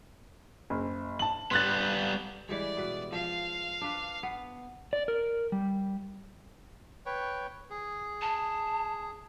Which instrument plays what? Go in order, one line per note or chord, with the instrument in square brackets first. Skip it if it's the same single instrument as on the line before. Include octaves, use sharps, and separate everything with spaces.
[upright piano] F#1
A5 F#7
[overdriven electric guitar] G3 B3 [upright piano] C6 F#6 A6
[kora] E3 G3 G#3 [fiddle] D5
[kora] B2 B4
[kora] F3 [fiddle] F5
[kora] D4 B4
B3
[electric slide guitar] D5
A#4
G3
[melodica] B4 C#5 G5
G#4
[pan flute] A5